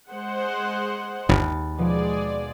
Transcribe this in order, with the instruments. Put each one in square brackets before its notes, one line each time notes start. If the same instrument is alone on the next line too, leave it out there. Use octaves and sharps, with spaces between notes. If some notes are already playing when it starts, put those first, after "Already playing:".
[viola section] G#3 C5 F#5
[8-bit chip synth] G1 [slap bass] D#2 [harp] A5 B5
[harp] B2 F3 [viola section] G#3 G#4 D5